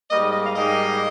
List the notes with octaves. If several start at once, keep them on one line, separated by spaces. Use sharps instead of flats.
G#2 G3 A#3 D#5
D#5
D#5
F5
G#2 G3 A#3 D#5